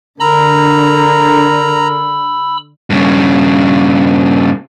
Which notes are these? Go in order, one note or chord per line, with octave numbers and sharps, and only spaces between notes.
D3 A#4 A#5 B5 E6
G2 C#3